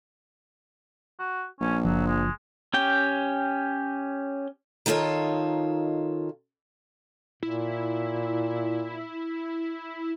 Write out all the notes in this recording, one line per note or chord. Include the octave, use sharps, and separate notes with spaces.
F#4
A#1 C#4
F#1 F3 F#3
G#3
C#4 G4 G5
D#3 D#4 F4 A4 C#5
A#2 E4